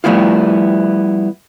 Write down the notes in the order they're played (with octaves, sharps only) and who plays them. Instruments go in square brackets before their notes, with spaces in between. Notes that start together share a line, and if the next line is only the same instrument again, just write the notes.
[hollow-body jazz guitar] F3 G3 A3 B3 E4 F4